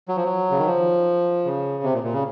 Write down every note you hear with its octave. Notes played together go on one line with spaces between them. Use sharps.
F#3
F3
F#3
C#3
D#3
F3
C#3
C3
A#2
A#2
C#3